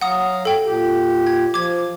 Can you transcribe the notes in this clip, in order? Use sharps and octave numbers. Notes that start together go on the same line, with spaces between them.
F#3 F5 F#5 A#5 D#6
A4 G5
A#2 G4
G#6
F3 D6 G#6